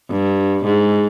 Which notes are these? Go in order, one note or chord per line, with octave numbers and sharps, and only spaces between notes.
G2
G#2